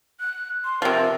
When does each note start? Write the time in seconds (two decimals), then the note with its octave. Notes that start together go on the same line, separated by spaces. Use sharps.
0.20 F#6
0.64 C6
0.82 C3 F3 A#4